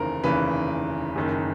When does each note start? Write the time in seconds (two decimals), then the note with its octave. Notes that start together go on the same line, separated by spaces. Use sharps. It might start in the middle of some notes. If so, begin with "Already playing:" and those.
Already playing: F1 D#2 C#3 E3 A#4 C5
0.24 F1 D#2 C#3 E3 B4
1.16 F#1 F#2 D#3